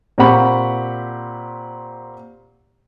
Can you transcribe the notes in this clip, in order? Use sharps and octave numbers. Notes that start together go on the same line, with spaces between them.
A#2 C4 G4 F#5 B5 C#6